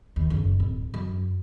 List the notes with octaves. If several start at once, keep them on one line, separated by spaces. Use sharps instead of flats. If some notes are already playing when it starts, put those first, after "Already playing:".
D#2
F#1
D1
F#2